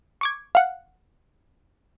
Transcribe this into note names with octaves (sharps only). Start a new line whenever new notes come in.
C#6 D6 G#6
F5 F#5